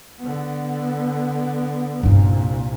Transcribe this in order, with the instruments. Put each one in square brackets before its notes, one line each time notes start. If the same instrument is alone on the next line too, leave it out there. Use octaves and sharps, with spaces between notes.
[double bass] D3 B3
[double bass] C2 A#2 [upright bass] G2 D#4